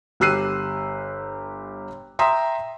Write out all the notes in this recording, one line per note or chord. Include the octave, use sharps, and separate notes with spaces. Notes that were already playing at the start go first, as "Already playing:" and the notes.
G1 G4 E6 F#6 C7 D#7
E5 G5 A#5 C6 D#6